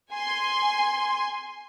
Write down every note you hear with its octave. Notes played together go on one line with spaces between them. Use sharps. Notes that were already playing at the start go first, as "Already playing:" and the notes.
G#5 C6